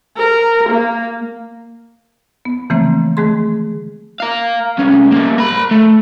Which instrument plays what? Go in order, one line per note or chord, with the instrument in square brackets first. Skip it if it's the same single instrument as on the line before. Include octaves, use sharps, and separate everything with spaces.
[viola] A#4
A#3
[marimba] B3
C#3 E3 F3 A3 A#3 C4
D#3 G#3 A3 G#4 C6
[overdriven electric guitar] A#4 F5
C2 C#4
G3 A#3
A#4 B5
A3